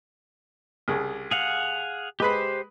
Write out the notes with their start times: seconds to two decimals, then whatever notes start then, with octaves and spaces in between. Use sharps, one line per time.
0.88 C2 C#3
1.31 G#4 F5 F#5
2.20 G#3 G4 B4 C5 B5